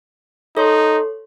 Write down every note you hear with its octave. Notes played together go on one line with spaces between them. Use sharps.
D#4 A4 C#5 C6